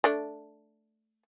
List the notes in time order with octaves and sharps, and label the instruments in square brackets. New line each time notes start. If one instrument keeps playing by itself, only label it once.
[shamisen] A3 D4